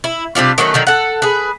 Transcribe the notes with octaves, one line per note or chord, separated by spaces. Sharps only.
E4
C3 G3 D4 F4
D#3 F#3 A3 C#4
D3 D#3 F#3
A4 F#5
G#4 B4